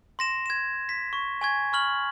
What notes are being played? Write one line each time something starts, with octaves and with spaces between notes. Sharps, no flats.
C6 A#6 E7
G#6 E7
B6
C#6
G#5 C#6 G#6
B5 C#6 F6 F#7